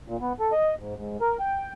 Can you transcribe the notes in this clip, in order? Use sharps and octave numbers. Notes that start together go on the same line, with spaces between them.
A#2
B3
A4
D#5
G#2
G#2
A#4
G5